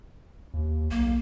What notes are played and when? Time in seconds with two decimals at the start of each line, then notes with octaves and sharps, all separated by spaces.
0.54 D#2
0.91 B1 A#3